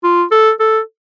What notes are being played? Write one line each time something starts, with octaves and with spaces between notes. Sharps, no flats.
F4
A4
A4